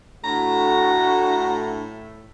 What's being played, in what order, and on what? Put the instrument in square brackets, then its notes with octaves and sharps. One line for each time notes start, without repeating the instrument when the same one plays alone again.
[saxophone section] A2 A3 [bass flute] D4 [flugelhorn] F#4 [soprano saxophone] A#5